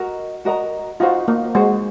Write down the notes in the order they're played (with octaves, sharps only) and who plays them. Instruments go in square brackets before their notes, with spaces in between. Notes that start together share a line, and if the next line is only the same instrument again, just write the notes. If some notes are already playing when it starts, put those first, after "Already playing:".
Already playing: [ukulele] F#4 A#4 D#5 A#5
F#4 A#4 D#5 A#5
[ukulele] D#4 F#4 C5 [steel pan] F4
[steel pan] A#3
[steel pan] G#3 [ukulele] D#4 F#4 C5